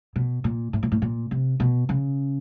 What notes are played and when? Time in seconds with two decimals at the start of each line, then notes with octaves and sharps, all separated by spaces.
0.16 B2
0.44 A#2
0.73 A2
0.83 A#2
0.92 A2
1.02 A#2
1.31 C3
1.60 B2
1.89 C#3